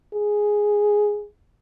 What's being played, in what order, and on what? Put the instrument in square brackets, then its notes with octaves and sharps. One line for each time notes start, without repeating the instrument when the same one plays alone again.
[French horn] G#4